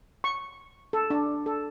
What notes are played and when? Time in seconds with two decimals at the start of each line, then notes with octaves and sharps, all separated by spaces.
0.24 C#6
0.93 A4
1.10 D4
1.46 A4